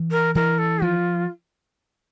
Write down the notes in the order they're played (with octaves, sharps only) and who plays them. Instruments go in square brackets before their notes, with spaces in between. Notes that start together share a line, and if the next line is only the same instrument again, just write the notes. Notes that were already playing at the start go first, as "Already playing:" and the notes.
Already playing: [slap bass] E3
[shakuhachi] A#4
[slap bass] E3 [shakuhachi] A#4
[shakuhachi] A4
[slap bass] F3 [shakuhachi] F4